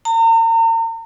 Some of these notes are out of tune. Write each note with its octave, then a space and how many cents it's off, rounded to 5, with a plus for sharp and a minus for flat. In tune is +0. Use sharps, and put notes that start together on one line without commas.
A#5 -40